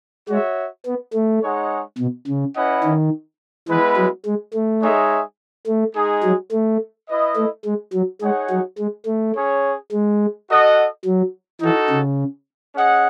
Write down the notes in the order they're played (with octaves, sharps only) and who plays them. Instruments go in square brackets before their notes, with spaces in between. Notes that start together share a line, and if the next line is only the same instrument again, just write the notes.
[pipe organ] G#3 [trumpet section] F#4 C#5 E5
[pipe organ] B3
A3
[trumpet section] G#3 D#4 G#4 C#5 F#5
[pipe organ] B2
C#3
[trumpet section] C#4 E4 B4 D#5 F#5
[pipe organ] D#3
[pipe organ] E3 [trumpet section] G#3 B3 E4 B4
[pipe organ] F#3
G#3
A3
[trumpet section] G#3 D#4 G#4 C#5 E5
[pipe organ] A3
[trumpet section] G#3 D#4 G#4
[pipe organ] F#3
A3
[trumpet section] E4 B4 D#5
[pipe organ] A3
G#3
F#3
[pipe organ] G#3 [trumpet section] D#4 G#4 C#5 F#5
[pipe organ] F#3
G#3
A3
[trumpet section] C#4 G#4 C#5
[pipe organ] G#3
[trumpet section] F#4 A4 D#5 F#5
[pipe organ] F#3
[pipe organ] E3 [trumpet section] D#4 F#4 A4
[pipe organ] C#3
[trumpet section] C#4 G#4 D#5 F#5